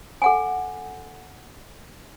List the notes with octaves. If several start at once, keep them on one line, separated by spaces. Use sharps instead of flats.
A4 F#5 G#5